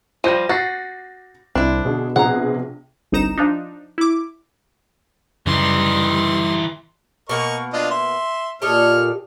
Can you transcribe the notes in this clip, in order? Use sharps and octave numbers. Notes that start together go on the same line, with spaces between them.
F3 G3 G6 A#6 D#7
F#4 A6 A#6 C7
C2 C4 D4 E4
B2 D3 G#4
A#1 C3 G#4 F#5 A#5
G1 C2 D#4 A#5 E7
F3 D4 D#4
E4 D6
F#2 C#3 E3 G3 D#4 C6
B2 A#3 A#4 D#5 F#5 C#6
D4 F4 D#5
E5 C6
A#2 G4 A4 C#5 D#5 F6